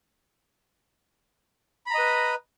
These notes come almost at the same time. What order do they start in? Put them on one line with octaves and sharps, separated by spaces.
B5 A#5 D#5 B4